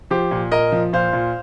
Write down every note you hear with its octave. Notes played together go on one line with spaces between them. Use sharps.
F3 G4 C5
A#2
A#2 A#4 D#5
F3
A#2 C5 F5
A#2